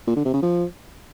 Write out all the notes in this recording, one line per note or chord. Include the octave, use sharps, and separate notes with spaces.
A#2
D3
C3
C#3
F3